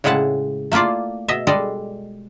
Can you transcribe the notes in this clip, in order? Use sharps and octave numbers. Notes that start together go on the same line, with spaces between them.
A2 C#3 G#3 E4 F#5 A5
A3 A#3 E4 F4 D5
B2 D#5 E5
G3 G#3 A4 D5 D#5